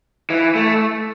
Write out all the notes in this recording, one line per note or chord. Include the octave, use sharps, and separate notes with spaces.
E3
A3